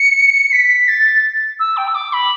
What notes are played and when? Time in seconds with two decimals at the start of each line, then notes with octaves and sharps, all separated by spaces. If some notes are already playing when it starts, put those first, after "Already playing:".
Already playing: C#7
0.53 B6
0.88 A6
1.60 E6
1.77 G5
1.87 E6
1.95 D6
2.13 B5